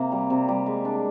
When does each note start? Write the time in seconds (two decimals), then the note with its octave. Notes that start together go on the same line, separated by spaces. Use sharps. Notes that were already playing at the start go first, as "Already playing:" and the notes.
Already playing: C3 A#3
0.12 G3
0.30 C3
0.48 G3
0.66 G#3
0.85 D4